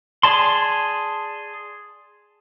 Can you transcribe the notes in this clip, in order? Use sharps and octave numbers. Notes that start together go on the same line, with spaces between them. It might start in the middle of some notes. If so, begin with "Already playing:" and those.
G#4 D5 A5 C6